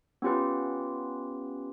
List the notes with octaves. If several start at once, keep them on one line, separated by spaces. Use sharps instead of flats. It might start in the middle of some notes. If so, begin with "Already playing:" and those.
B3 C#4 F4 G4 B4